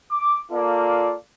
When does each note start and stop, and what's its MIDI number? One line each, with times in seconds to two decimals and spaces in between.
0.10 0.39 86
0.51 1.14 58
0.51 1.14 65
0.51 1.14 69
0.51 1.14 74